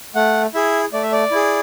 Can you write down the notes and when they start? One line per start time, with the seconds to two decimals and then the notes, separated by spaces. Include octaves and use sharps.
0.15 A3 F#5
0.54 E4 G#4 E5
0.93 A3 D5
1.03 E5
1.12 D5
1.31 E4 G#4